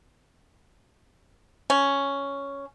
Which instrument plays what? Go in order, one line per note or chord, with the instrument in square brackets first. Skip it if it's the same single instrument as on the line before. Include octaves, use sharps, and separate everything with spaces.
[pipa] C#4